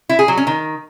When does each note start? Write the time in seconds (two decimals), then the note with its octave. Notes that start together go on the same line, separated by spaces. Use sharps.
0.09 E4
0.19 G#4
0.28 F#3
0.37 C#4
0.47 D#3